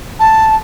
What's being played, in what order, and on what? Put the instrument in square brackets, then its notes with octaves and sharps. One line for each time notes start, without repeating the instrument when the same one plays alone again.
[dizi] A5